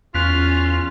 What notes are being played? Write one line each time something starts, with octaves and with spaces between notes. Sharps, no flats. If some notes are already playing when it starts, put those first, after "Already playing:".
E2 C#4 F4 F6 F#6 B6